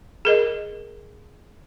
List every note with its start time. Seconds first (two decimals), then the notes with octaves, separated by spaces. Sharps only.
0.25 G#4 A#4 D#5